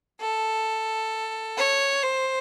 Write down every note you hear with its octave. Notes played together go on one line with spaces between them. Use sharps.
A4
C#5
C5